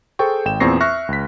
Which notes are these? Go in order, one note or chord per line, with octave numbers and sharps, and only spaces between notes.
G#4 A4 C5 G5 C#6
G#1 G5 E7
E2 A#2 C4 C#6 A#6 C7
E5 C#6 F6 F#6 A#6
C#2 B6